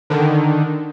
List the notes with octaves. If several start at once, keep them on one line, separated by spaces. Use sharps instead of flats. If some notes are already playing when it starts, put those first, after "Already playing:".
D3 D#3